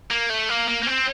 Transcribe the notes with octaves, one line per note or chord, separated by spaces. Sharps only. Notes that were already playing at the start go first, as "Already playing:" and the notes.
A#3
A3
A#3
A#3
A#3
C4